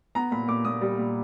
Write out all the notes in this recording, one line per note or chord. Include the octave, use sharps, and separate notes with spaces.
B3 A#5
A#2 B5
A#2 D6
A#2 D#6
G3
A#2